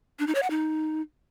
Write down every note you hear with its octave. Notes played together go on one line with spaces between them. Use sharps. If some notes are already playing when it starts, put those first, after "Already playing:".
D4
D#4
C#5
F#5
D#4